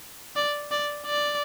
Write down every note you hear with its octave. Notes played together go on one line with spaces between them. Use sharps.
D5
D5
D5